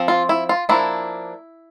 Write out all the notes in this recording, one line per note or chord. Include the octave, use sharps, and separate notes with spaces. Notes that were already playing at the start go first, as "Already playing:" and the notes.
Already playing: F3 C4
F4
E4
F4
F3 A#3 D4 E4